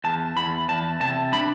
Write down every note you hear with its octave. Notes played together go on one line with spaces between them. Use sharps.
E2 A5
E2 B5
E2 A5
C3 A5
D4 B5